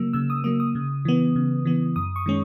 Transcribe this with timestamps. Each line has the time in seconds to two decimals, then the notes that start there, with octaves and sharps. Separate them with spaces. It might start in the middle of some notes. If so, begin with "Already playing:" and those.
Already playing: C#3 F#3 A#3 E6
0.13 C#3 E6
0.30 D#6
0.44 F#3 A#3 D#6
0.60 D#6
0.75 C#3
1.05 E3 B3
1.36 C#3
1.65 E3 B3
1.96 F#2 D#6
2.16 C#6
2.26 D#3 G#3 C#4